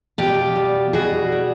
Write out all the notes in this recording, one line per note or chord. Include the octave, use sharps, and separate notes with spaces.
B2 F4 G4
G3
B2 F#4 G#4
G3